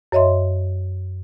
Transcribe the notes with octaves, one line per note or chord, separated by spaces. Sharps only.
F#2 C#5 D#5 E5 C6